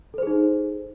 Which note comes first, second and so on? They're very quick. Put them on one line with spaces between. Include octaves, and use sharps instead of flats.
A4 C5 G#4 D#4